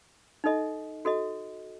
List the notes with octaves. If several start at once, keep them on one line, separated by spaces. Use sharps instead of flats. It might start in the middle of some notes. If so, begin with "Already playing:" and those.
D#4 A4 D#5
F#4 A4 D#5